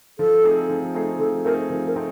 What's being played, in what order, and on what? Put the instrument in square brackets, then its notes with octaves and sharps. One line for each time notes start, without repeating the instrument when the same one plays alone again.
[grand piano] F3 [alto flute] A4
[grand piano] A3 C4 D#4 G#4
F3
A3 C4 D#4 G#4
[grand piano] F3 [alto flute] A4
[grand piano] A3 C4 D#4 G#4 [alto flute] A#4
[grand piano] F3
[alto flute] A#4
[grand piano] A3 C4 D#4